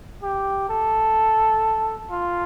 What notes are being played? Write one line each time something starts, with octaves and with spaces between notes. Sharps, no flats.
G4
A4
F4